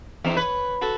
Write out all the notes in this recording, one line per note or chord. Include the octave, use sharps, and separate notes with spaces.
E2 E3 C4 D#4
B4 C#5
F#4 A4 B4